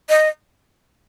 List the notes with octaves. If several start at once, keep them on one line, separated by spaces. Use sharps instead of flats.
D#5